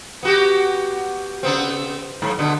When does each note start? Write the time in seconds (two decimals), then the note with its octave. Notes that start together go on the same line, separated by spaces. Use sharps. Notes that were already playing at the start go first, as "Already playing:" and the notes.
0.23 B3 F#4 G4
1.43 C#3 B3 C4
2.22 G#2 F#3
2.39 B2 D3 B3